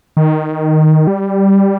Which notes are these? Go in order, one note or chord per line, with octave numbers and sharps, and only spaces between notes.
D#3
G3